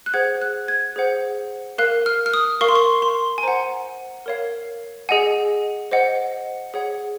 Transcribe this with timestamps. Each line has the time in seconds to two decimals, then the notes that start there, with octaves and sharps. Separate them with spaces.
0.06 F#6
0.14 G#4 C5 F#5 G#6
0.42 F#6
0.68 G#6
0.96 G#4 C5 F#5
1.78 A#4 F5 F#6
2.06 F6
2.26 F6
2.34 D#6
2.61 A#4 F5 C#6
2.69 C6
2.75 C#6
3.02 C6
3.38 G#5
3.43 C5 F#5 A#5
4.26 A#4 C#5 F5
5.09 G#4 D#5 F#5 G#5
5.91 C5 D#5 F#5
6.74 G#4 C#5 F#5